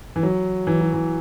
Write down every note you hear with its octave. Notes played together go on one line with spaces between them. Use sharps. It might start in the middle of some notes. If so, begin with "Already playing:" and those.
E3
F#3
E3
F#3
E3